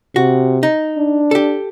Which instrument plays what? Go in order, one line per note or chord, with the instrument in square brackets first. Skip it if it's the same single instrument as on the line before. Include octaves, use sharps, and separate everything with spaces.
[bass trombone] C3 [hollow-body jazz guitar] F#4
[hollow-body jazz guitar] D#4
[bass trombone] D4
[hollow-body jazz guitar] G4 A4